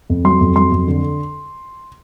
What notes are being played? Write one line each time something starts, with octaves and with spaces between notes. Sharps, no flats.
F2
F#3 C6
F2
F#3 C6
F2
D3